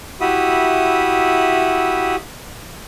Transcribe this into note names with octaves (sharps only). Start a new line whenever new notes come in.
E4 F#4 G4 E5 B5 D#6